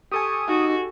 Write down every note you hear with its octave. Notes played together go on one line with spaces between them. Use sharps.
G4 A4 G#5 C#6 D#6
D#4 F#4